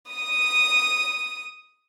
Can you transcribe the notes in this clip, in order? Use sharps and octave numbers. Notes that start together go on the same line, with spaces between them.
D#6 D#7